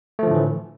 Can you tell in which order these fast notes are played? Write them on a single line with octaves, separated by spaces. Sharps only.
A3 F3 D3 A2 E3